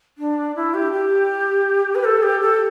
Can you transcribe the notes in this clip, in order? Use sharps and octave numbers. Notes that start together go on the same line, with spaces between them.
D4
E4
G4
G4
B4
A4
G4
A4